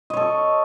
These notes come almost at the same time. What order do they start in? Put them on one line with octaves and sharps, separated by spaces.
D#5 C#5 A4